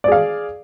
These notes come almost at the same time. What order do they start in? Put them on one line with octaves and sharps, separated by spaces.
D5 G#4 F5